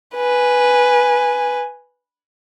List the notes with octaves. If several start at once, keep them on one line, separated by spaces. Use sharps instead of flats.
B4 G#5